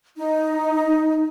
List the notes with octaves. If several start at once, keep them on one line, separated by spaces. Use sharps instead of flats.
D#4